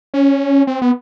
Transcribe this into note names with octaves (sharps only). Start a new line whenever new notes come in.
C#4
C4
B3